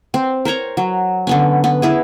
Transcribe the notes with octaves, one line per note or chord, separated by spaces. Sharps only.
C4
A#4 C5 C#5 A#5
F#3
D3 B3 C#4
B3
B3 E4 G#4